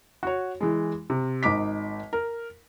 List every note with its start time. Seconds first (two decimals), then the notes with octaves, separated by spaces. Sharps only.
0.23 F#4 C#5
0.60 E3 G#3
1.10 C3
1.43 G#1 D#4 D6 B6
2.13 A#4